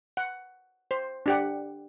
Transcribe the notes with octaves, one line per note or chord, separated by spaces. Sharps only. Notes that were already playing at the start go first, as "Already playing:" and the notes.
F#5
C5
D4 G4 F#5